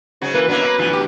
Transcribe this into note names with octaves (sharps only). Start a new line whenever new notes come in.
G#2 C#3 F#3
E3 A#3 B4
F#3 A#3 B3 D4 E4
E5 B5
D2 E3 F3
G4